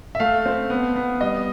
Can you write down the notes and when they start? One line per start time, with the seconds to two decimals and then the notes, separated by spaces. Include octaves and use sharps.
0.15 E5
0.20 A3 F5
0.46 C4
0.70 B3
0.96 B3
1.21 G3 D#5